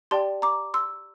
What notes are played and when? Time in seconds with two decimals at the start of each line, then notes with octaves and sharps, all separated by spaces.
0.11 G4 D5 G5 A5 C6
0.42 A#5 D6
0.74 C6 E6